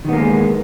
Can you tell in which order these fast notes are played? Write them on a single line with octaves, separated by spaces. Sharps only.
D#3 B3 A#3 G#3